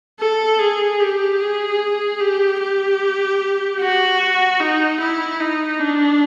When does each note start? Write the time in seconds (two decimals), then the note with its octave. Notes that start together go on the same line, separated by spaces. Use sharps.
0.20 A4
0.59 G#4
0.99 G4
1.40 G#4
2.20 G4
2.60 G4
3.80 F#4
4.60 D#4
5.00 E4
5.40 D#4
5.80 D4